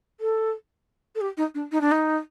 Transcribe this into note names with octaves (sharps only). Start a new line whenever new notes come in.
A4
A4
G4
D#4
D4
D#4
D4
D#4